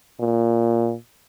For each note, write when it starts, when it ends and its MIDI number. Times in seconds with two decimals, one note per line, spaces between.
0.20 0.95 46